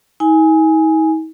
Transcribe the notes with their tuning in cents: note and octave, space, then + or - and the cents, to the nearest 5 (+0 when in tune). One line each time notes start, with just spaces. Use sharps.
D#4 +45 G#5 +0